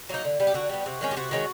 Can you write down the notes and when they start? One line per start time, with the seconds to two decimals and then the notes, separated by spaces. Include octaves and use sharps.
0.09 F#3 A#3 D#4
0.25 D3
0.40 G3 B3
0.47 G4
0.54 D3 F#4
0.70 G3 B3
0.86 C3
1.01 D#3 G#3 C#4
1.11 G4
1.17 C3 F#4
1.31 D#3 G#3 C#4